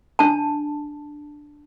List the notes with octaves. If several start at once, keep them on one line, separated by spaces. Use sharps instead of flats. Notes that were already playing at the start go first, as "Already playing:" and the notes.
D4 A5